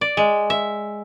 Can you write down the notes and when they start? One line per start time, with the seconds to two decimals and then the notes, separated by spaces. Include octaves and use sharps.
0.01 D5
0.17 G#3
0.50 E5